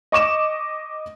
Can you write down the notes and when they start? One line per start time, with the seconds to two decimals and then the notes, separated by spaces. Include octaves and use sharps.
0.12 D#5 C#6 D6 E7